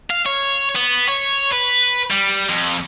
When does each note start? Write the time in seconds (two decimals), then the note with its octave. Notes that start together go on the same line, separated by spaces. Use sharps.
0.11 F5
0.26 C#5
0.76 B3
1.09 C#5
1.53 B4
2.11 G3
2.49 F2